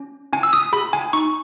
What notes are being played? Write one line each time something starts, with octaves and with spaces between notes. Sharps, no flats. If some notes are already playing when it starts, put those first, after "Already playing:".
Already playing: C#4
C#4 G#5
E6
D#6
G#4 B5
G#5
D#4 C#6